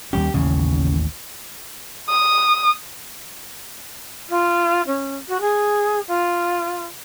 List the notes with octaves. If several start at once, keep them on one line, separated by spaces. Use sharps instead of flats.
D#2 G3 C#4 G4
A1 D#2 C#3
D#6
F4
C#4
F#4
G#4
F4